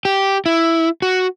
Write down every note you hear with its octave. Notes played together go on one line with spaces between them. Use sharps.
G4
E4
F#4